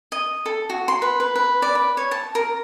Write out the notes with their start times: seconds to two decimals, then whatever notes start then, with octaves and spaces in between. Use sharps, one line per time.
0.12 D#5
0.46 A4
0.70 F#4
0.88 C6
1.02 B4
1.20 B4
1.35 B4
1.62 D5
1.75 B4
1.97 C#5
2.11 A5
2.35 A#4